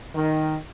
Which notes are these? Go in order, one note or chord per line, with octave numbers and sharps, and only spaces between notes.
D#3